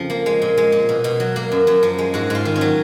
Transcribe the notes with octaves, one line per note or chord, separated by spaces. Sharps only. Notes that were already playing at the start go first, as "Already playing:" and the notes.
Already playing: F2 C#3 F3
A#3
G#3
A#2
G#3
A#2
B2
B2
F#3
A#3
F#2
F#2
F3
G#3
G#2 F#4
G#2 F4
D#3
C#4
F#3